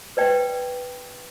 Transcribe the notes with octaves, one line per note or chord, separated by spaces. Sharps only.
B4 D5 G5